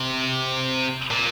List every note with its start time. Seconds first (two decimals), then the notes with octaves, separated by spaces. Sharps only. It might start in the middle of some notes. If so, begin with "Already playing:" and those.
Already playing: C3
1.10 A#2